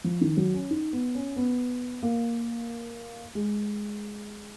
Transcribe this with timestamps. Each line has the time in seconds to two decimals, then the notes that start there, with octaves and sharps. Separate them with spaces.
0.04 F3
0.21 D#3
0.37 F#3
0.54 C#4
0.70 D#4
0.93 B3
1.15 C#4
1.36 B3
2.03 A#3
3.35 G#3